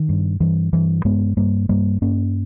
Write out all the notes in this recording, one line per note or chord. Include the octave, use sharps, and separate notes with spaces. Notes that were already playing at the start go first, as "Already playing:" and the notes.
Already playing: D#3
G2
G2 E3
G2 E3
G2 G#3 B3
G2 G3 A#3
G2 G3 A#3
G2 A#3 C#4